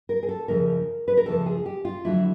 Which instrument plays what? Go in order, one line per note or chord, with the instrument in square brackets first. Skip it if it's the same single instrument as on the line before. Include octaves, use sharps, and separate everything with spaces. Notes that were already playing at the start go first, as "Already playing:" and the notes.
[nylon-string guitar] A#4
G#4
A4
F2 C#3 F3 A3 A#4
B4
A#4
F2 C#3 F3 A3 A4
G#4
G4
F4
F2 D3 F#3 A3 E4